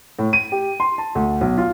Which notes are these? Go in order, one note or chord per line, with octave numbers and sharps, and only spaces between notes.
A2
D#7
G4
C6
A5
D2
B1
F4